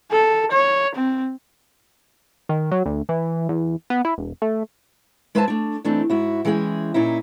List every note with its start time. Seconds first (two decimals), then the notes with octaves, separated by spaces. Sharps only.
0.11 A4
0.52 C#5
0.95 C4
2.49 D#3
2.71 F#3
2.86 D2
3.09 E3
3.49 E2
3.90 B3
4.05 E4
4.18 E1
4.42 A3
5.35 G#3 B4 C5 E5 G#5 A5
5.48 A3 D4
5.84 E3 A3 C4 D4 D#4
6.10 G#2 E4 F#4
6.45 E3 G#3 C#4 G#4 G5
6.94 A#2 C#4 D#4 E4